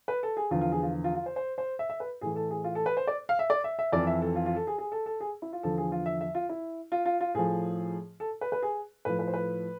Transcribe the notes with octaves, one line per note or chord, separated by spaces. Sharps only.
B4
A4
G#4
E2 D3 F3 F4
F4
G#4
F4
F4
F4
C5
C5
C5
E5
E5
B4
A2 E3 G#4
A4
G#4
F4
A4
B4
C5
D5
F5
E5
D5
E5
E5
F2 E3 D5
E5
A4
F4
F4
A4
G#4
G#4
A4
A4
G#4
E4
F4
E2 D3 F3 A4
G#4
F4
E5
E5
F4
E4
F4
F4
F4
A2 F3 G#4
A4
B4
B4
G#4
A2 F3 B4
B4
C5
B4